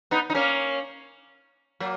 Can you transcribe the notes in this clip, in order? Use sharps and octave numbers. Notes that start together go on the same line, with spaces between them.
B3 D#4
D#4
A#3 C#4
F#3 A#3